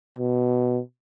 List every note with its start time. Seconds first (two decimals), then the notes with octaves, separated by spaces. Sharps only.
0.19 B2